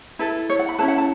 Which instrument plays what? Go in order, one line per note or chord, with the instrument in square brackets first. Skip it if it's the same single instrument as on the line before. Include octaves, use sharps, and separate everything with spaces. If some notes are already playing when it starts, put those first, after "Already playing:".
[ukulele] E4 A4 B4
C#5
F#5
B5
C#4 E4 B4 A5
F#5
A5